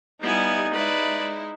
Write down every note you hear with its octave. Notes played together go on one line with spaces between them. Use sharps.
G3 B3 D#4 E4 G#5
G#3 E4 B4 D5